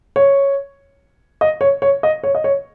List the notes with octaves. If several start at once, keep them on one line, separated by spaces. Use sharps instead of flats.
C#5
D#5
C#5
C#5
D#5
C#5
D#5
C#5